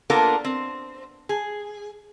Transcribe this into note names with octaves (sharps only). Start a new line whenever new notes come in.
A#3 B3 D4 F4 A4 A#4
C4
G#4